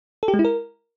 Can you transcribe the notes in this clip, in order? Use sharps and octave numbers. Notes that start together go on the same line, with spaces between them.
A4
G4
G#3
E4
A#4